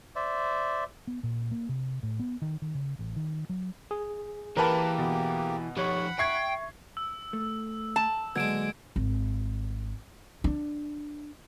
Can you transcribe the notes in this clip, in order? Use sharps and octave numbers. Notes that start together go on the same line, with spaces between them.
C5 D5 E5
B3
A#2
A#3
C3
A2
B3
D#3
D#3
C#3
A1
D#3
F#3
G#4
E3 A#3 G4 A#4 B4 A5
B2
F3 D#4 G4 C#5 F#5 B5 C#6
E5 G5 C#6 G#6 C7
E6
A3
A5
A#2 D3 F#3 G#3 B3 G#6 D7 E7
G#1
D4